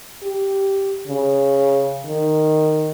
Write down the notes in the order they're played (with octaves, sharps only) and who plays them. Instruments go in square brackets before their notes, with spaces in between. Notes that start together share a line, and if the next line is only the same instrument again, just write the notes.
[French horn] G4
C#3
D#3